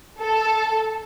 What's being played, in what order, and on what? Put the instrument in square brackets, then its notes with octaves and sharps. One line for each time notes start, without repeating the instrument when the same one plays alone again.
[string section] A4